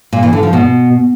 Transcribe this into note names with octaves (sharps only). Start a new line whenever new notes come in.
A#2
E3
D3
F3
B2